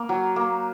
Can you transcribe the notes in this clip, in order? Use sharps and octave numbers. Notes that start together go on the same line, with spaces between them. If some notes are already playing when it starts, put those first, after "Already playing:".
Already playing: A#3
F#3
A#3